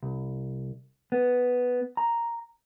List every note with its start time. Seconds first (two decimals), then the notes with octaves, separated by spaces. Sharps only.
0.03 C2
1.12 B3
1.97 A#5